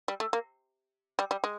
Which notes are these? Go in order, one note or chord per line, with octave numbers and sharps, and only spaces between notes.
G3
A3
A#3
G3
G3
G#3